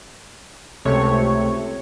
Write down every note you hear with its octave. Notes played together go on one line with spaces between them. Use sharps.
C#2 C3 A3 C#5 C#6